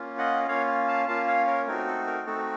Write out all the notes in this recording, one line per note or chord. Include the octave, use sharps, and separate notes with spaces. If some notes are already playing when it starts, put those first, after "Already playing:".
Already playing: A#3 C#4 F4
D#5 F#5
A#3 C#4 F4 C#5 F5
F5 A5
A#3 C#4 F4 F5 A5
C#5 F5
A#4 C#5
A3 C4 D#4 F#4 A#4
A4
A#4
A3 C4 D#4 F#4 A4